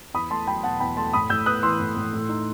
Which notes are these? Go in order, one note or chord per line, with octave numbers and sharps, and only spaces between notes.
E2 B5 D#6
A3 A5 C6
F#3 G5 B5
B2 F#5 A5
E2 G5 B5
A3 A5 C6
A2 B5 D#6
A2 E6 G6
B3 D#6 F#6
E3 C6 E6
A2
A2
A2
D#4